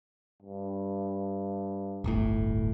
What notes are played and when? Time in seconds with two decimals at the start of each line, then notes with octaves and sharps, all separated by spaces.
0.42 G2
2.04 D1 G1 A2